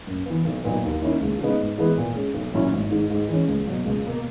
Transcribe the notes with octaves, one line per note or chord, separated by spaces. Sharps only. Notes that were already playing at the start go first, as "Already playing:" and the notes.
F#2
E3 B3
B1
A#2 F#3 B3 D#4
D#2
D#3 A#3 C#4 E4
C#2
C#3 G#3 B3 D#4
G#2
E3 G#3 B3 E4
A#2
G#3 C#4
B1
A#2 F#3 C#4 E4
G#1
G#2 D#3
G#2
E3 G#3 C#4
C#2
B2 F#3
C#2
B2 A#3